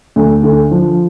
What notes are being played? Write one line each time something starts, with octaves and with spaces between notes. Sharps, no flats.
D2
D3
F3